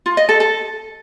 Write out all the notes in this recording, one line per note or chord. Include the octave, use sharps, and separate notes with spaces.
F4
D#5
A4
A4